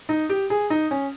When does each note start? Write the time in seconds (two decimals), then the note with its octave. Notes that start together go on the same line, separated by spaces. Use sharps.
0.09 D#4
0.29 G4
0.50 G#4
0.70 D#4
0.91 C#4